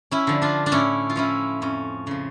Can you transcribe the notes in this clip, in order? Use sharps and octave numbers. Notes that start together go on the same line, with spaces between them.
C#4 E4
D3 F3
D4 F4
D4
A2 C#4 E4
F4
F3 C#4 E4
F2 C#4
C#3 F3